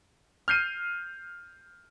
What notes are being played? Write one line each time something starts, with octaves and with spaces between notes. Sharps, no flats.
F6 G6 C7 D#7